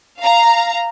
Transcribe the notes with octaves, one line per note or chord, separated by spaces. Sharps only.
F5 A#5